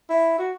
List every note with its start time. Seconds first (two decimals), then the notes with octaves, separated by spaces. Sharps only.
0.09 E4
0.38 F#4